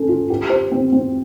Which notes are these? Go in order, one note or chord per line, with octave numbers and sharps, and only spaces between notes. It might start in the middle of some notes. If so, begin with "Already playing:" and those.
Already playing: C#4 A4
F4
G4
C5
C4
C4